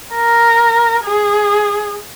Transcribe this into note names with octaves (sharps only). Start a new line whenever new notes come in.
A#4
G#4